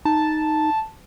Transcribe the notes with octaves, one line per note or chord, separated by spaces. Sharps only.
D#4 A5